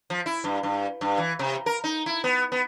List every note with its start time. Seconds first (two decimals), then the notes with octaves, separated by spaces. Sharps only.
0.10 F3
0.26 E4
0.44 G2
0.63 G2
1.01 G2
1.18 E3
1.39 C3
1.66 A#4
1.84 D#4
2.06 E4
2.24 B3
2.52 B3